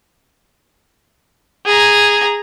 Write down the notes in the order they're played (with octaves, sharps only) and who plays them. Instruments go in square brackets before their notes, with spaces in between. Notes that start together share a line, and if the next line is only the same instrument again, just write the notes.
[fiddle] G#4 A#5